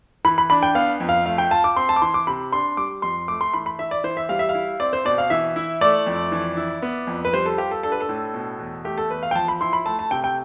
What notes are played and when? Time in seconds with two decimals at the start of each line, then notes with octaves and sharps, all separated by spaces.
0.25 E3 B5
0.38 B5
0.50 D4 B5
0.63 G5
0.75 B3 F5
1.00 F2
1.09 F5
1.26 A3 F5
1.38 G5
1.51 F4 A5
1.64 D6
1.76 C4 C6
1.89 A5
1.96 D6
2.02 E3 C6
2.14 D6
2.27 C3 B5
2.53 D4 C6
2.77 G3 D6
3.02 F2 C6
3.28 A3 D6
3.41 C6
3.54 E3 B5
3.66 B5
3.79 E4 E5
3.91 D5
4.04 E3 C5
4.17 E5
4.29 G3 F5
4.39 E5
4.49 F5
4.55 E4
4.80 C4 D5
4.93 C5
5.05 B2 D5
5.18 F5
5.30 E3 E5
5.56 E4
5.81 A3 D5
6.07 F2
6.32 E3
6.57 E4
6.82 B3
7.07 F2
7.25 B4
7.33 G3 C5
7.46 A4
7.58 F4 G4
7.71 A4
7.83 D4 A4
7.92 B4
8.00 A4
8.09 A2
8.34 B2
8.60 E2
8.85 A3 G4
8.98 A4
9.10 E2 B4
9.23 F5
9.31 G5
9.35 F3 A5
9.48 B5
9.61 E4 C6
9.73 B5
9.86 A3 A5
9.99 A5
10.11 C3 G5
10.24 G5